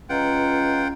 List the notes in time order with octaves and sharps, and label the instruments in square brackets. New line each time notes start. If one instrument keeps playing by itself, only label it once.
[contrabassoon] C#2 [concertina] F4 F#5 G5 [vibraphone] B4 D#5 A#5